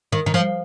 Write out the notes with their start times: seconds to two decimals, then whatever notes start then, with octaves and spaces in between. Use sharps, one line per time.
0.12 D#3
0.26 D#3
0.34 F3